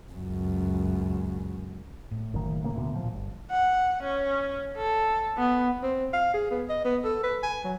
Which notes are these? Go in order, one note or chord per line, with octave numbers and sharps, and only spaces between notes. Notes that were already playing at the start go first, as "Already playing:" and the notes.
C#2 F#2
A2
F#1 D#3
C#3 A#3
D2 B2
A#2 F3
G1
F#5
C#4
A4
B3
C4
F5
G#4
B3
D#5
B3
A4
B4
G#5
F#3